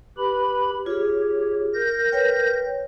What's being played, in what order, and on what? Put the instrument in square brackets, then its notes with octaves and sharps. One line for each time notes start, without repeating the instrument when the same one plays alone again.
[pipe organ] G4 B4 B5
[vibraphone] F4 G#4 [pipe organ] G4 C#5
[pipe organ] A#4 G6 A#6
[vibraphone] B4 C#5 G5